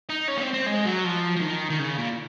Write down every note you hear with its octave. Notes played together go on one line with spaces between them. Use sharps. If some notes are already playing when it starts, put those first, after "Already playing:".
D#4
C#4
A#3
C4
C4
G#3
F#3
F3
F3
D#3
D#3
C#3
A#2